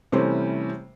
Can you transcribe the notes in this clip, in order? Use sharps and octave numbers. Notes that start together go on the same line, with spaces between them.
C3 E3 G3 A3 C#4 C5